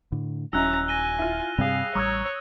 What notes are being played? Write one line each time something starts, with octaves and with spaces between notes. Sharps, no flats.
A2 D3
D#1 F#3 C#4 D#4 E4 A#5 E6 F#6
G#5 A#6 D#7 G7
E4 F4
G2 C3 G3 C4 G#4 F5
A1 G3 C#5 A#5 C#6 D#6 E6 G#6